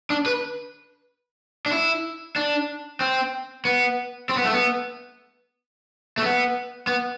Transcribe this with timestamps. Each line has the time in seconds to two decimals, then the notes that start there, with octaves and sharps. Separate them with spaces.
0.10 D4
0.26 B4
1.66 D4
1.71 E4
2.36 D4
3.00 C4
3.65 B3
4.29 C4
4.37 B3
4.45 A3
4.53 B3
6.18 A3
6.23 B3
6.87 B3